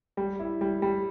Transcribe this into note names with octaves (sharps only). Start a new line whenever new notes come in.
G3
E4
G3
G3